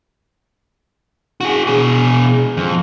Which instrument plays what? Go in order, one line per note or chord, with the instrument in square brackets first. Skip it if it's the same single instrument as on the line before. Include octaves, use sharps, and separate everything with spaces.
[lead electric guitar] F#4 G#4
B2 G#4
F2